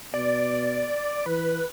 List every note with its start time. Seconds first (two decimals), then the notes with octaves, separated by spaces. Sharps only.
0.14 B2 D5
1.26 E3 B4